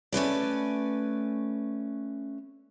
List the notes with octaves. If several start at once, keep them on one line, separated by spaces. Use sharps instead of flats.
A3 C#4 B4 D5